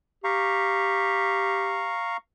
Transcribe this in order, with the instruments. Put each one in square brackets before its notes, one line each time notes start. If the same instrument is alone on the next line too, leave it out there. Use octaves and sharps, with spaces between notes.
[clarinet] G4 [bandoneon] F5 A#5 C#6